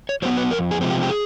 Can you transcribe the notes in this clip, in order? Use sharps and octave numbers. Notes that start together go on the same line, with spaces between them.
C#5
F#3 B3 C5
B4
F2 A#4
G#4
C3 F3 G#3 C4
G4
G4
G#4